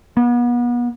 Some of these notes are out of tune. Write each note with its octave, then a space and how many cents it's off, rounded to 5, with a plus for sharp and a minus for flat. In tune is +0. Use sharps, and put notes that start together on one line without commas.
B3 -35